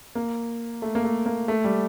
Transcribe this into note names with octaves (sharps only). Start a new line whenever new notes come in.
A#3
A3
A#3
A3
A#3
A3
G3